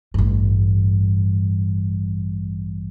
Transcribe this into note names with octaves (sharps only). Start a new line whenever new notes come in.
A1 G2